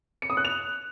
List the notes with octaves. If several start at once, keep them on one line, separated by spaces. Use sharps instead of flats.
C#7
D#6
F#6
F7